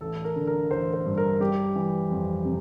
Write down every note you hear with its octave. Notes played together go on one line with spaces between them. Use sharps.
A1 A4
A#4
D3
A#4
A1 C5
C5
G2
A#4
G3 G4
E3
F2
C3